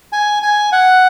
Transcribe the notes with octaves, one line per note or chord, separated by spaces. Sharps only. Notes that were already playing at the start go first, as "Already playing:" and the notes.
G#5
G#5
F#5